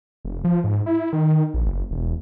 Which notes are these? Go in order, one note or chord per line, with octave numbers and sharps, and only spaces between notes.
F1
F3
G#2
E4
D#3
A#1
F#1
E1